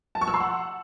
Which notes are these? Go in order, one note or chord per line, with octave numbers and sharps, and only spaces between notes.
A5
C#6
E6
C6
F#5